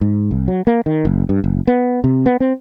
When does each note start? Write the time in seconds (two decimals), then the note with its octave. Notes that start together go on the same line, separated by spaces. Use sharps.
0.01 G#2
0.31 C2
0.48 F#3
0.67 A#3
0.86 D#3
1.05 F#1
1.29 G2
1.44 F#1
1.67 B3
2.04 C3
2.26 B3
2.40 C4